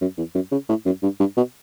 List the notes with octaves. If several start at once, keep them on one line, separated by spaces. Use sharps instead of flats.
F#2
E2
F#2
C#3
A2
F#2
G2
G2
B2